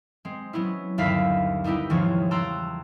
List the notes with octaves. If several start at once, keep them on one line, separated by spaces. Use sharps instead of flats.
G#3 C4
F#3 B3 C#4 E4
G1 D#2 E5 F5 B5 B6
G3 B3 D#4 E4 G4
G#1 E2 C#3 F3 C#5
G5 A5 A#5 C6 E6 F#6